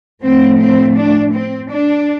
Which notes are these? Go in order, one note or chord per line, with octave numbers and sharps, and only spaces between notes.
A2 F3 A3 C4
C4
D4
C4
D4